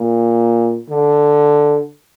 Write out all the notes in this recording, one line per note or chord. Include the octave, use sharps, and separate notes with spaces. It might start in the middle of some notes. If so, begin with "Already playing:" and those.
Already playing: A#2
D3